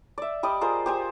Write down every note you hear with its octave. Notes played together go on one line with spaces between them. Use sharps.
D5 E5
G3 D5 D#5 D#6
F4 G#4 A#4 C5
G4 C5 G#5